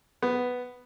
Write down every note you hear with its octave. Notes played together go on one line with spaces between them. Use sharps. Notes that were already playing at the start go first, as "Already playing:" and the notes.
B3